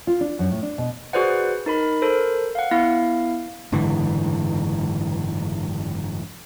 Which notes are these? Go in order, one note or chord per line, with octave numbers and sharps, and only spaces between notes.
F4
D4
F#2
A2
D4
B2
F#4 G#4 B4 C5 D5 F#5
D#4 A#4 B5
A4 A#4 C5
F5 F#5
B3 E4 F5
F#1 G#2 D3 E3